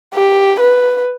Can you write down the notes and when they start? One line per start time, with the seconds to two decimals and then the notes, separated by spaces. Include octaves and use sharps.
0.14 G4
0.60 B4